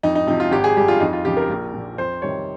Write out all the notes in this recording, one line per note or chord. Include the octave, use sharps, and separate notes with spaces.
F2 D#4
D#4
C3 F3 D#4
F4
G#1 G4
G#4
G2 G3 G4
F4
F2 D#4
F4
C#3 F3 G4
A#4
A#1
A#2 F3
F2 C5
C3 D#3 G3 C#5